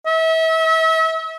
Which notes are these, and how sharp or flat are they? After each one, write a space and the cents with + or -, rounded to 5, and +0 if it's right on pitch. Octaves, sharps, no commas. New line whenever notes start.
E5 -35